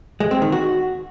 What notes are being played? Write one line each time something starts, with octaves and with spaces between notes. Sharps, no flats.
G#3
C4
D#3
F#4